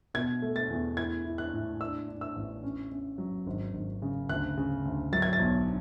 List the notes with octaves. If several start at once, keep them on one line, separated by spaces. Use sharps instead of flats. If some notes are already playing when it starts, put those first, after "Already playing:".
B2 G#6
A3
A6
E2
E4 G#6
E4
F#6
A2
D4 E6
D4
E6
A1
C#4
C#4
F#3
G#1
G#1
C#3
D2 F#6
C#3
D2
F#3 A6
G#6
A6
B1